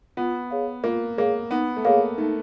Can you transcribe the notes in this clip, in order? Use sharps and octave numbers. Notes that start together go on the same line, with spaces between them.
B3 F4
G#4 C#5 F5
A#3 F4
A#3 G#4 C#5 F5
B3 D#4
A3
A#3 G#4 C#5 F5
A3 D#4